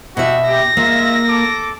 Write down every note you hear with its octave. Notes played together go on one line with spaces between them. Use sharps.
B2 F#4 G4 E5 F#5
G4 A#6
G#3 A#3 F4 E5
A4 D6